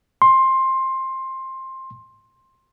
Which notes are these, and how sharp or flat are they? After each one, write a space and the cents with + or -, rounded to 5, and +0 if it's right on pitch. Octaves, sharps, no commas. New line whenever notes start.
C6 +15